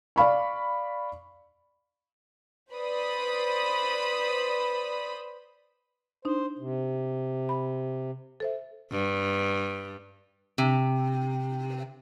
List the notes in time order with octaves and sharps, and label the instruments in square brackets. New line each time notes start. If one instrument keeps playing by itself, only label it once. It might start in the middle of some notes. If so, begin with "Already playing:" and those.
[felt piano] D5 F5 B5 C#6
[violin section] B4 C5 D5 B5 D#6
[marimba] D4 D#4 [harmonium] C5
[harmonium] C3
[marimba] B5
A4 C5 E5
[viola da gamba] G2
[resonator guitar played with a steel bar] C3